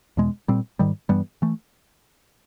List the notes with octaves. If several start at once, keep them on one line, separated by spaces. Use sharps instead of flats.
E2 B2 G#3
A#2 G3 C4
G#2 D#3 G3
G2 E3 G3 B3
E3 A3